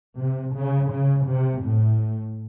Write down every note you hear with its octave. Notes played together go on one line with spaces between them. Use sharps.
C3
C#3
C#3
C3
A2